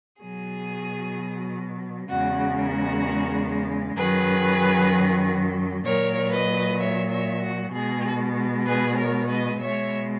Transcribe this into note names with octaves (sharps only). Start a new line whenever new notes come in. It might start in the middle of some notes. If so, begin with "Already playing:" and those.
B2 F#3 G#4
E2 C#3 G#3 F#4
F#4 A#4
F#2 D#3 F#3 G#4 B4
A#2 F#3 A#4 C#5
B4 D#5
C#5 E5
C#5 E5
F#4
B2 G#3 G#4
G#4 B4
A#4 C#5
B4 D#5
B2 G#3 C#5 E5